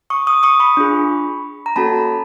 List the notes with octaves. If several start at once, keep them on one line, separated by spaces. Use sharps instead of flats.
C#6 D#6
C#6 D#6
C#6 D#6
B5 C#6
D4 F4 G#4
A#5
A#3 C#4 F#4 A4 A5 B5